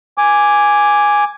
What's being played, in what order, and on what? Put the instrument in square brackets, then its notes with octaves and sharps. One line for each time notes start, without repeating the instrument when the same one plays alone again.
[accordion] G#5 D6